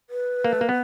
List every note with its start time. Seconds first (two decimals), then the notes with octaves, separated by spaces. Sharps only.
0.10 B4
0.44 A#3
0.53 A3
0.61 A#3
0.69 B3